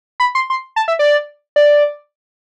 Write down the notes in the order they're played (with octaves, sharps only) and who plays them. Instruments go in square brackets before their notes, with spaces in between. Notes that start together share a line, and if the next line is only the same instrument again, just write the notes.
[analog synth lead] B5
C6
C6
A5
E5
D5
D5